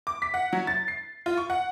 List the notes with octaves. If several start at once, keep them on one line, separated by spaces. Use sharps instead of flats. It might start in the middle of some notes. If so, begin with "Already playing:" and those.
D6
B6
F#5
F#3
A6
C7
F4
C#6
F#5